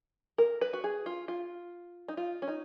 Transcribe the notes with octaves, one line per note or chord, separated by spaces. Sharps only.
A#4
B4
F#4
G#4
F4
F4
D#4
F4
C#4
D#4